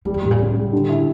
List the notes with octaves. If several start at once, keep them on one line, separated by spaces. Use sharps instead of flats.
E3 G3
F2
A2 G3
A#2
A2 C#3
G3
D3
E4